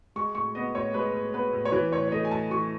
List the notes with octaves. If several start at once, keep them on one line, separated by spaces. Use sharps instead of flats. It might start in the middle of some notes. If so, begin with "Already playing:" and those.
G#3 C#6
A2 C#6
B3 D#5
A2 C#5
G#3 B4
A2
B3 B4
A2
C#5
E3 B4
A2 C#5
C#5
A3 D#5
G#5
A2 A5
E3 C#6